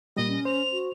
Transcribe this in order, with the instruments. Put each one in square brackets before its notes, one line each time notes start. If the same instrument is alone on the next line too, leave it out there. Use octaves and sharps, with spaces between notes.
[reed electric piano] A#2 G3 [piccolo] D#5
[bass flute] C#4
[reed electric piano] C5 [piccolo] F7
[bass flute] F#4